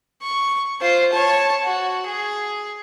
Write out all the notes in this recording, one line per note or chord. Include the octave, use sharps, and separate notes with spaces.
C#6
F4 C5
C#5 A5
F#4
G#4